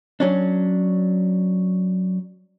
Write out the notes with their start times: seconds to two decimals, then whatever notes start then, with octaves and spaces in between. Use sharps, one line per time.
0.20 F#3 C#4 D4